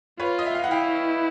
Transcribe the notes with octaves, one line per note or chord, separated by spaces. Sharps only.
F4 B4 C#5
D#5
E5
F5
F#5
E4 F5 G5